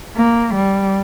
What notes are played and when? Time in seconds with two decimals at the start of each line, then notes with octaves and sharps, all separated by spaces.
0.17 A#3
0.55 G3